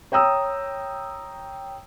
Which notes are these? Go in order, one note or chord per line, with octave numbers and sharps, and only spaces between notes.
C#5 G5 A#5 D#6 E6